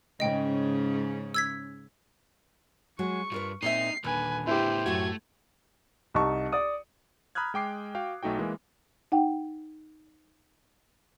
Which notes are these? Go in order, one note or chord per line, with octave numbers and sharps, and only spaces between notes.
G#2 C#3 C#4 D#5 G5
E6 G#6 B6
F#3 G#3 F#4 C#6
G2 F4 A#4 B4
A#2 C4 D#4 E5 C7
D#2 A#2 D3 B4 G#5
A2 B3 E4 G4 C5
F#2 A2 A3 F#4 G#6
C2 D#4 A5 C#6
D5 D#6
A#5 B5 D#6 F6 F#6 G#6
G#3 G5 D6 C7
F#4 F5 G5
B1 A3 D#4 F#4 G5
E3 G#3 A#3
D#4 F#5 G5